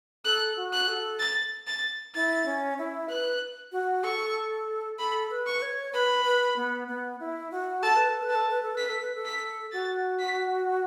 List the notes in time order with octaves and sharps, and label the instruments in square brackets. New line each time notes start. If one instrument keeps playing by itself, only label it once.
[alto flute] A4 [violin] F#6
[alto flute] F#4
[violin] F#6
[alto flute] A4
[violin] A6
A6
[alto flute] E4 [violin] A6
[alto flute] C#4
E4
[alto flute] B4 [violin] F#6
[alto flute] F#4
[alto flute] A4 [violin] C#6
[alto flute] A4 [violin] B5
[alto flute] B4
[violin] C#6
[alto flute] C#5
[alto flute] B4 [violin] B5
[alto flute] B4
B3
B3
E4
F#4
[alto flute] A4 [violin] A5
[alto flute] B4
A4
B4
[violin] A5
[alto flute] A4
B4
A4
[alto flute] B4 [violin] B6
[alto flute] A4
B4
A4
[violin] B6
[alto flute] F#4 [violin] A6
[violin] B6